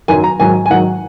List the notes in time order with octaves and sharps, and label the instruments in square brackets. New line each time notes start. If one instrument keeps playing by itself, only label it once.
[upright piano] F#2 D#3 F#3 G#5
A#5
G#2 D#3 F#3 G#5
G#5
G#2 D#3 F#3 F#5